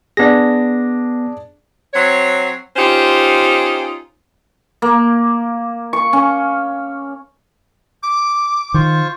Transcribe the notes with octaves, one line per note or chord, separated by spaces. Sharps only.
B3 D4 G#4 A#6
F#3 C4 C#5
C#4 D#4 F4 G4 C5
A#3
C#6
C#4
D6
D#3 F4 C5 C#6